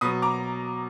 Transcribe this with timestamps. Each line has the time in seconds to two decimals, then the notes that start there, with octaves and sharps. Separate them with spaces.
0.01 B2 B5 D#6
0.04 F#3
0.22 A#5 D6